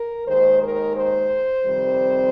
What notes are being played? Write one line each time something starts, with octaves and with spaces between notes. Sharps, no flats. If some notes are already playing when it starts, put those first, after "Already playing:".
Already playing: A#4
D#2 D#3 G#3 C5
A#4
C5
F2 C3 D#3 G3 C4